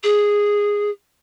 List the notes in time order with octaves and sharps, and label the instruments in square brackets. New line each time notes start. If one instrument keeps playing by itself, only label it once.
[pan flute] G#4